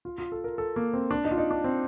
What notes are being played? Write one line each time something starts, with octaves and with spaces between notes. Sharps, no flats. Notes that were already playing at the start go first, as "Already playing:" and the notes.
F4
F4
A4
A#4
A4
A#3
C4
D4
D#4
F4
D#4
D4
C4